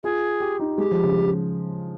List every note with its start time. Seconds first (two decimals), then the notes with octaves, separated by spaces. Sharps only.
0.04 F4 G#4
0.40 G4
0.60 D#4
0.78 G#3 G4
0.91 F3
1.03 C#3
1.16 C#3